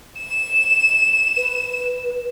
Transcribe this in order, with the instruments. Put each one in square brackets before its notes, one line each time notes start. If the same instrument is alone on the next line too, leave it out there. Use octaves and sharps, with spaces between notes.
[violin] E7
[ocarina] B4